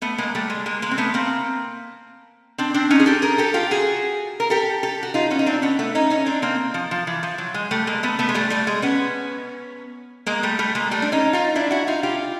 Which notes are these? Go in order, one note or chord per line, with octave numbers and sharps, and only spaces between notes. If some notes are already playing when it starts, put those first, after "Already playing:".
A3 B3
G#3 A#3
G3 A3
G#3
G#3 A#3
G#3 A#3
C4
A3 B3
A#3 C4
C4 D4
C4 D4
C#4 D#4
G#4
G4 A4
G#4 A#4
G4 A4
F4 G4
F#4 G#4
A#4
G4 A4
G4 A4
F#4
D#4 F4
B3 C#4
D#4
C4 D4
B3 C#4
A3 B3
C#4 D#4
C#4 D#4
C4 D4
A#3 C4
F3
F3
E3
F3
F#3
G#3
G3 A3
G#3 A#3
A3 B3
A3 B3
G#3
G3 A3
G3 A3
G#3
B3 C#4
G#3 A#3
G3 A3
G3 A3
G#3 A#3
G3 A3
D4
C#4 D#4
D#4 F4
D4 E4
E4 F#4
D#4 F4
F4 G4